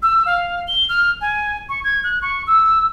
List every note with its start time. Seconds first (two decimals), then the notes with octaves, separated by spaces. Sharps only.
0.02 E6
0.26 F5
0.68 G7
0.89 F6
1.21 G#5
1.69 C#6
1.84 G#6
2.04 F#6
2.22 C#6
2.47 E6